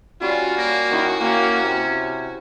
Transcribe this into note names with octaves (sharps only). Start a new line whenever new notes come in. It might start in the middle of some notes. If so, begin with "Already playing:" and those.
G3 C#4 F4 F#4 G#5
A#3
D#3 C#4 E4
A#3 C#4 G5
C3